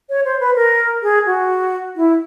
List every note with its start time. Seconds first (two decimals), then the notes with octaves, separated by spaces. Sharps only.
0.09 C#5
0.25 C5
0.40 B4
0.56 A#4
1.03 G#4
1.26 F#4
1.96 E4